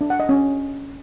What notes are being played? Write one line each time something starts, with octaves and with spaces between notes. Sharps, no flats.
D4
F#5
D#5
C#4